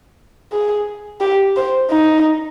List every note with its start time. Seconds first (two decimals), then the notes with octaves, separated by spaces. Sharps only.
0.52 G#4
1.21 G4
1.56 C5
1.90 D#4